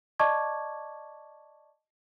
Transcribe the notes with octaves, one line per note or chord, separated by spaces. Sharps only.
D5 D#5 A5 C#6 D6 G#6